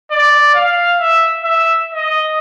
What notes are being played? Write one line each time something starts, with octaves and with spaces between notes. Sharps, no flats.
D5
F5
E5
E5
D#5